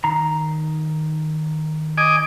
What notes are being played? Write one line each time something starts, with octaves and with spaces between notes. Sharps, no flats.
D#3 A#5
D#5 G#5 D6